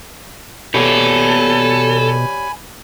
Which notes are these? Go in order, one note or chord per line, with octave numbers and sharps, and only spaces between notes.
B2 G4 A4 C#5 D5 G#5 B5